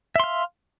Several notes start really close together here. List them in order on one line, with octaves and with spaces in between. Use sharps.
E5 C6 F5